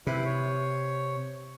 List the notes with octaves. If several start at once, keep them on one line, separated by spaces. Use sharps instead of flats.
C3 E4 B4
C#5